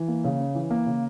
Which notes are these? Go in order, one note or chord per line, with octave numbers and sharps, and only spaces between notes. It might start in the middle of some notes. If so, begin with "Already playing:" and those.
Already playing: E3
A#3
C#3
C#4
E3
A#3
C#3